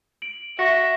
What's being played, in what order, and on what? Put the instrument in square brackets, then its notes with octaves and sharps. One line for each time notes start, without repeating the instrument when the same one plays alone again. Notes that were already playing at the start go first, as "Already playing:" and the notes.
[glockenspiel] D7 F#7
[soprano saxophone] F#4 [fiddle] E5 [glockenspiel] C#6 A#6